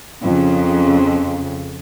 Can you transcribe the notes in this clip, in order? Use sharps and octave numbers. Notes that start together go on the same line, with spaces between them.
F2 C#3